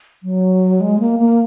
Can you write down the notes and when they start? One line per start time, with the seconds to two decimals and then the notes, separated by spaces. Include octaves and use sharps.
0.23 F#3
0.81 G#3
0.99 A#3
1.19 A#3